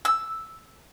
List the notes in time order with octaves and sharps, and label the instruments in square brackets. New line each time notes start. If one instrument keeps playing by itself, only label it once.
[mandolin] E6